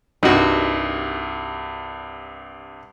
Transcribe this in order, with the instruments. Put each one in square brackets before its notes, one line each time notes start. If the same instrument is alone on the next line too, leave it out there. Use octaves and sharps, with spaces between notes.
[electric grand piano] C2 G2 [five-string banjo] D#4 F#4